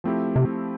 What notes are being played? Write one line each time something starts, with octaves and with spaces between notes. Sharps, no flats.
F3 A3 C4 E4 G4
C3